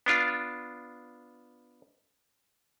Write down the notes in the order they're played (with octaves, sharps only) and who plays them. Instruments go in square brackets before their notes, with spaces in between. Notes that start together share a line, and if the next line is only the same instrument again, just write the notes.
[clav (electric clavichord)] B3 D4 F4